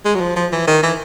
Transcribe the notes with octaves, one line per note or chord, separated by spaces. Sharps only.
G#3
F#3
F3
F3
E3
D#3
E3